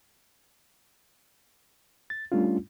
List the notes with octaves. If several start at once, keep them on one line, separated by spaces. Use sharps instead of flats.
A6
G3 A3 C#4 D4 F4